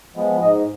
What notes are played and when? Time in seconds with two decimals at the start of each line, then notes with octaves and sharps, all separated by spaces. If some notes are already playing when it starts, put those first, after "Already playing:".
0.16 F3 G#3 B3
0.42 G#2 D#5